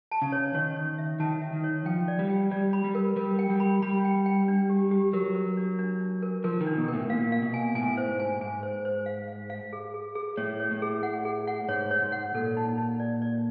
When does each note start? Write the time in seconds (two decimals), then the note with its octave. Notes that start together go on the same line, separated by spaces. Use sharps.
0.11 A5
0.22 C#3
0.32 C#5
0.54 D#3 C#5
0.76 C#5
0.98 E5
1.20 D#3 A5
1.42 E5
1.53 D#3
1.64 C#5
1.86 F3 G5
2.08 D5
2.19 G3
2.30 G5
2.51 G3 D5
2.73 B5
2.84 G3
2.95 A#4
3.16 G3 A#4
3.39 G5
3.50 G3
3.60 B5
3.82 G3 B5
4.05 G5
4.26 G5
4.48 D4
4.70 G4
4.91 G4
5.13 F#3 A#4
5.35 A#4
5.57 D4
5.79 D4
6.01 D4
6.23 A#4
6.44 F3 A#4
6.61 D#3
6.67 D4
6.77 B2
6.88 A#4
6.94 A2
7.09 A#2 F5
7.32 F5
7.42 B2
7.54 G#5
7.75 A2 G#5
7.97 C5
8.08 G#2
8.20 G#5
8.41 G#2 G#5
8.63 C5
8.85 C5
9.06 F5
9.28 F5
9.50 F5
9.73 G#4
9.94 G#4
10.15 G#4
10.37 A2 C#5
10.60 C#5
10.71 A2
10.82 G#4
11.03 F#5
11.25 G#4
11.47 F#5
11.69 G#2 C#5
11.91 C#5
12.02 G#2
12.12 F#5
12.34 A#2 A4
12.57 D#4
12.78 D#4
13.00 D5
13.22 D5